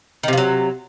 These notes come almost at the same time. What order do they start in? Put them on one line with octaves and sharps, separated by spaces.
D#3 C3 F3 F#3